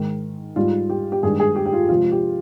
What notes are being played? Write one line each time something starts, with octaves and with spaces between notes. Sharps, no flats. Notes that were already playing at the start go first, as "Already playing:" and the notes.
Already playing: G#2 D#3 G#3
G#2 G3 F4
G4
G4
G2 D#3 G#3 G#4
G#4
G4
G4
F4
C3 F3 G#3 F4
G4